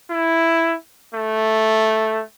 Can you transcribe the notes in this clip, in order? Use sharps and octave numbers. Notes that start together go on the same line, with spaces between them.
E4
A3